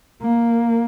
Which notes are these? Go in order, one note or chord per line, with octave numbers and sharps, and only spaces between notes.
A#3